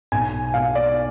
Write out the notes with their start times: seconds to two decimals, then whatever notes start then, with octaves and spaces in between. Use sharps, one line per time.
0.12 B1 G#5
0.54 B2 F5
0.75 D5